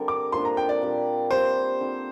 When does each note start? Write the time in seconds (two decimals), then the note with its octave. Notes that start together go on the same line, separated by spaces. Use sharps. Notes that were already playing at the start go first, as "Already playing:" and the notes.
Already playing: D3 G3 C4 A#4
0.08 D6
0.32 F3 A#3 D4 C6
0.45 A#5
0.57 G5
0.69 D5
0.82 A#2 G3 C4 G4
1.31 G3 C4 G4 C5
1.80 D3 F3 C4 F4